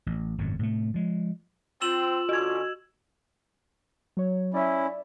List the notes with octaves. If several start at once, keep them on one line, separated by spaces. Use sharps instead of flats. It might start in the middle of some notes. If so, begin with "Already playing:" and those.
A1
G#1 F#2 A2 C3
A2 C3 A3
F3 G#3
C4 F4 E6 E7 F#7
D3 C#4 F#4 G#6
F#3 C#5
C#4 E4 D5 E5